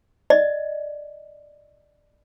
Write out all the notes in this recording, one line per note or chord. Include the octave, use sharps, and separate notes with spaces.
D5 D#5